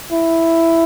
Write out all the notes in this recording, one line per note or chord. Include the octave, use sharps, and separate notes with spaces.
E4